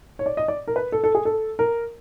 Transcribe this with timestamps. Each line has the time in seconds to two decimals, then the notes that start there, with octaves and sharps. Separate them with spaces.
0.19 C#5
0.26 D5
0.37 D#5
0.48 D5
0.68 A#4
0.76 B4
0.92 A4
1.04 A4
1.15 G#4
1.25 A4
1.59 A#4